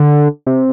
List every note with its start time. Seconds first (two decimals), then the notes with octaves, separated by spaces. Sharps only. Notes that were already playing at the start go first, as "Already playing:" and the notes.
Already playing: D3
0.47 C3